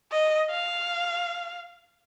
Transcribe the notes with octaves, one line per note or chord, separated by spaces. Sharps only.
D#5
F5